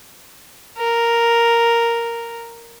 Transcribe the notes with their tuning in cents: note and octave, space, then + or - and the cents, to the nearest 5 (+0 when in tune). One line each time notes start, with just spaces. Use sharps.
A#4 +0